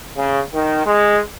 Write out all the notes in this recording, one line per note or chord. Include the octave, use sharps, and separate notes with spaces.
C#3
D#3
G#3